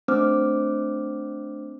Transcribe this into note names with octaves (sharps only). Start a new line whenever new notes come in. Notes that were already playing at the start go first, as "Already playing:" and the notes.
A3 C4 D4 C5 D6 F6